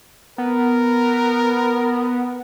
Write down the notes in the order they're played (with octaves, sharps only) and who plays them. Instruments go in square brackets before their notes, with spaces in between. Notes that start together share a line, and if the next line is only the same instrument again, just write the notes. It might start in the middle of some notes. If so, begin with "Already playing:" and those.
[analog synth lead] B3 [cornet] A#4